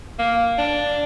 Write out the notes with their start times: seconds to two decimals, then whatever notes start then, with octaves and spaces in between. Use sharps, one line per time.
0.19 A#3
0.58 D4